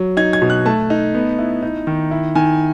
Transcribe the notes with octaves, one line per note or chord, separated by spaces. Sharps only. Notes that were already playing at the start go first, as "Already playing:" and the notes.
Already playing: F#3
D#4 G#6
G#6
B2
F#6
A3 A5
D#4
B3
E4
D#4
D#3
E4
D#3 G#5